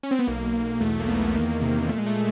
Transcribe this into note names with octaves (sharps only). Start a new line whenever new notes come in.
C#4
C4
B3
B1 A#3
B1
E2 A3
A#3
E2 B3
D#3 A#3
C3
A#2 A3
G#3
A3
A#2